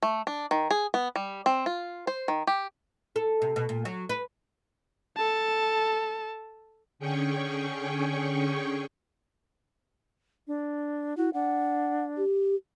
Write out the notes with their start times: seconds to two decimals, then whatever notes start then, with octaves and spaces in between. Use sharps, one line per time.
0.02 A3
0.27 D4
0.51 D#3
0.71 G#4
0.94 B3
1.16 G3
1.46 C4
1.66 F4
2.07 C5
2.28 D#3
2.47 G4
3.16 A4
3.42 C3
3.56 B2
3.69 A#2
3.85 F#3
4.09 B4
5.17 A4 A5
6.99 D3 C#4 G#4 G5 C#6
10.47 D4
11.17 E4 F#4
11.34 D4 F#5
12.17 G4